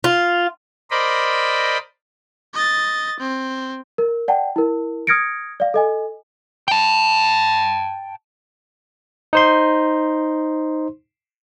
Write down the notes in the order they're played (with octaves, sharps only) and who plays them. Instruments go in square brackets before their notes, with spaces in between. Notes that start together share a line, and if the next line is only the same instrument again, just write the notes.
[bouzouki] F4
[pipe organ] A#4 C5 D5 D#5 B5
[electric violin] D#5 A6
C4
[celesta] A#4
D5 F#5 G5 A5
E4 A#4
D#6 F6 G#6 A#6 C#7 D7
D5 F5
A4 D#5 G#5
[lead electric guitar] G5 A5
[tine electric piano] D#4 C5 C6